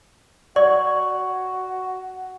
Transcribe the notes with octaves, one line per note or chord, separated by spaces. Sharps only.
F#4 D5 C#6